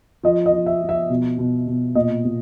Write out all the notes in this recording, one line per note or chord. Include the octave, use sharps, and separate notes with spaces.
F3 D#5
D#5
F3
E5
F3
E5
B2
B2
B2
A#2 D#5
A#2